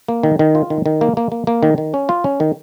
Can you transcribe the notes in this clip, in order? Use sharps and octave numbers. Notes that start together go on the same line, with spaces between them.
A#3
D#3
D#3
F4
D#3
D#3
A#3
A#3
A#3
A#3
D#3
D#3
C#4
F4
C#4
D#3